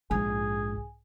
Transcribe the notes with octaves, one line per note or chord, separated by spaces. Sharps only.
A#1 G#2 G#4